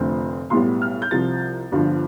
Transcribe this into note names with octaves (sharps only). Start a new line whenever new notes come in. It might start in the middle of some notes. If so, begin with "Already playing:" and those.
Already playing: F1 F2 D3 A3 C4
B1 A2 G3 B3 C6
F6
G6
C2 C3 F3 A6
G1 G2 D3 F3